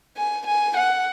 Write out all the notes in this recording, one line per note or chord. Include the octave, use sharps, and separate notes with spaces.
G#5
G#5
F#5